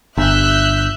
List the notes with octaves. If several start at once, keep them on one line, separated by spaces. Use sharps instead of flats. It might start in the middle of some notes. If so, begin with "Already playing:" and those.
G1 E5 F#6 G6